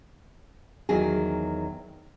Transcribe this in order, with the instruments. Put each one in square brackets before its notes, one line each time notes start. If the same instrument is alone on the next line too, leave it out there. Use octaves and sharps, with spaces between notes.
[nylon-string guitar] E2 D#3 F#3 G#4